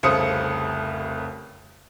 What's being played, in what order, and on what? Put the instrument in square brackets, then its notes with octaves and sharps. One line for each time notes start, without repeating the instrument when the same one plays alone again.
[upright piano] F1 C2 C#3 C5 D#6 C#7